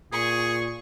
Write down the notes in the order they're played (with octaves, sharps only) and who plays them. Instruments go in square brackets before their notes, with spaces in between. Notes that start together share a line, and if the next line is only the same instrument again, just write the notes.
[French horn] A#2 [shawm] G#4 [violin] C#6